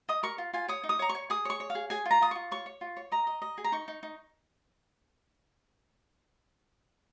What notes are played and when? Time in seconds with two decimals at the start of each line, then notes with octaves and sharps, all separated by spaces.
0.09 D#5 D#6
0.23 A#4 C#6
0.38 F4
0.53 F4 G#5
0.68 C#5 D#6
0.84 D#4
0.89 D#6
0.99 C#5 A#5
1.09 C#6
1.15 C#5
1.30 G#4 D#6
1.45 C#5 C#6
1.60 C#5
1.70 F5
1.75 G#4
1.90 G#4 G#5
2.05 F4
2.11 A#5
2.21 F4 D#6
2.31 F4 C#6
2.51 C#5 C#6
2.66 C#5
2.81 F4
2.97 C#5
3.12 D#5 A#5
3.27 D#5
3.42 D#5
3.58 G#4
3.64 A#5
3.72 D#4 C#6
3.88 D#4
4.03 D#4